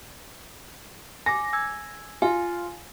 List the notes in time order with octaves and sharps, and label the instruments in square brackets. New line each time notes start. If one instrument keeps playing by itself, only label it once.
[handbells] G#5 D6 [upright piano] A#6
[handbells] G#5 E6 G#6
[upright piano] F4 [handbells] F5 G#5